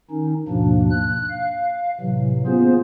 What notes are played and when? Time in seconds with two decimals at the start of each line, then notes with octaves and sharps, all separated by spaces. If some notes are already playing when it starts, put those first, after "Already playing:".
0.11 D#3 C#4 D#4
0.48 D#2 G#2 B2 F3 A#3 D4
0.91 F#6
1.30 F5
2.00 A2 C3 E3 F#3
2.47 A#3 B3 C#4 F4 G#4 C5